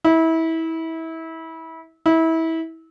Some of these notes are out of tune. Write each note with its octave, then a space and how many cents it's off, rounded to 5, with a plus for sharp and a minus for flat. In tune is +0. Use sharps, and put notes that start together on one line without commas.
E4 -25
E4 -25